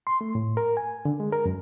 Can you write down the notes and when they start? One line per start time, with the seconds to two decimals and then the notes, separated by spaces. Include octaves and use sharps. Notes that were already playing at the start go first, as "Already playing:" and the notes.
0.07 C6
0.21 A3
0.35 A2
0.57 A#4
0.77 G#5
1.05 D3
1.20 G#3
1.32 A#4
1.46 F#2